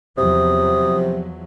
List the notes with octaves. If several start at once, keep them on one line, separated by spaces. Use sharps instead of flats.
E2 C3 F3 F#3 D#6